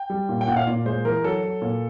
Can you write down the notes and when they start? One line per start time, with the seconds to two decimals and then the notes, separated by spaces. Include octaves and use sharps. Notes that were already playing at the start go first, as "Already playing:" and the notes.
Already playing: G5
0.10 G3
0.29 A#2
0.41 G5
0.47 A#2 F#5
0.56 F5
0.67 A#2 D5
0.86 G#3 C5
1.05 E3 A#4
1.23 F#3 A4
1.43 F#3
1.62 A#2